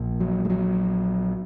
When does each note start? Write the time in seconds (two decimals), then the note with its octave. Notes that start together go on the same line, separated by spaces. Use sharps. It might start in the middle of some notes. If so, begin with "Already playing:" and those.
Already playing: A#1 A#2
0.20 F#3
0.45 G#3
0.50 F#3